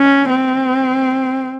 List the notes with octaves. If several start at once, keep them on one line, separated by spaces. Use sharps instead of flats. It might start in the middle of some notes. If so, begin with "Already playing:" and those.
Already playing: C#4
C4